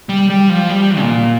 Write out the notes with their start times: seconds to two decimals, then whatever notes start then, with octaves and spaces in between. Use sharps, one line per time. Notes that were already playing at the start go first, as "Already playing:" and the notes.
0.09 G3
0.30 G3
0.50 F3
0.69 G3
0.99 A#2